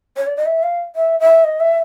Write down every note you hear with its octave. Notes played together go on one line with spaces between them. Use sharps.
C#5
D5
D#5
E5
F5
E5
E5
D#5
E5